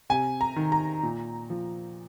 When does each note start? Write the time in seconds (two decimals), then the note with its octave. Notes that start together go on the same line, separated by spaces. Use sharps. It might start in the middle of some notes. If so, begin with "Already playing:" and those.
0.10 C3 G#5
0.41 A#5
0.56 D#3
0.72 A#5
1.03 A#2
1.50 F3